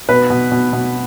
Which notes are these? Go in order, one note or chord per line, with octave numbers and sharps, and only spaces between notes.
B2 B4
B2
B2
B2